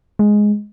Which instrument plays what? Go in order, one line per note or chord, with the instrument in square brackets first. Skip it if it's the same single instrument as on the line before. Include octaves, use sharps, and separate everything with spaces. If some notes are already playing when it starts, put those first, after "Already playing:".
[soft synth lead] G#3